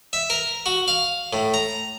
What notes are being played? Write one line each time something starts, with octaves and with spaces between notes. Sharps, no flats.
E5
A#4
F#4
F5
A2
A#5